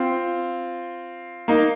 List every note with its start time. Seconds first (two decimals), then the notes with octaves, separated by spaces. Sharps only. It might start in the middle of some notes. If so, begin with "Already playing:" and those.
Already playing: C4 F4
1.48 A#3 D#4